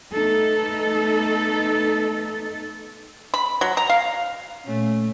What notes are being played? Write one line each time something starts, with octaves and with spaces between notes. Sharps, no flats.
A3 B3 D#4 A4
B5
F#3
A#5
F5
A#2 A3 C#4